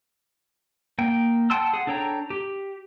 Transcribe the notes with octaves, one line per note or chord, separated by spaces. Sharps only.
A#3 G5
F#5 G5 A5 C6 E6
G#4 F#5
D4 A4 C#5 G5 A#5
G4